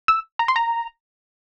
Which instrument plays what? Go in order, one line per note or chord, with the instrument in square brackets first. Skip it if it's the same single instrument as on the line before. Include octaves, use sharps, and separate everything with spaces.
[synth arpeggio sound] E6
A#5
C6
A#5